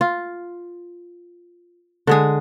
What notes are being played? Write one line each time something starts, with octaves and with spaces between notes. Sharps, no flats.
F4
D3 G#3 G#4